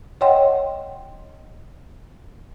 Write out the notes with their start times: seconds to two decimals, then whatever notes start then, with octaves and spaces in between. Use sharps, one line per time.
0.21 C#5 D#5 F#5 G5 C6